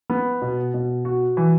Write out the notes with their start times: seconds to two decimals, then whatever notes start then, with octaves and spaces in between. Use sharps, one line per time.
0.10 B3
0.42 B2
0.74 B2
1.05 F#4
1.37 E3